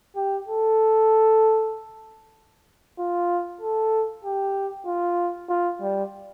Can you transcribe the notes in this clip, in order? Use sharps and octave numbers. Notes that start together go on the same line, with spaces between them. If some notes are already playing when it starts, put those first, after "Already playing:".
G4
A4
F4
A4
G4
F4
F4
G3